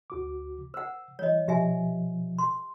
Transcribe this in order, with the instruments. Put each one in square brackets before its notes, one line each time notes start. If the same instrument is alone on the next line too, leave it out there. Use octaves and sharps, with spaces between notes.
[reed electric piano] D2 F#4 D6
[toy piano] C5 F#5 [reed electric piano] E6
[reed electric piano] E3 G3 [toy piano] C#5 D#5
[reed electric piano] B2 F3 [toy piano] G4 E5 G#5
[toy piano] C6